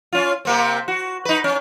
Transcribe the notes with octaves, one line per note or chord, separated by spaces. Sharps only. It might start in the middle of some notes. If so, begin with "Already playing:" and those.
C#4 F4
C3 A#3 C4
F#4
D#4 B4
C#4